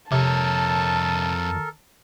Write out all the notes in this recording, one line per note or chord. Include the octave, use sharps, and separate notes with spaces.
F2 C3 A4 A#4 C#5 A5